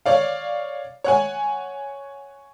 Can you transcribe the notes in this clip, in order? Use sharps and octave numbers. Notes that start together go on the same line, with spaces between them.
C#5 D5 F5
C#5 F#5 G#5